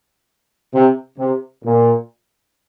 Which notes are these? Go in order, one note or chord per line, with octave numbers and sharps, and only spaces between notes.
C3
C3
A#2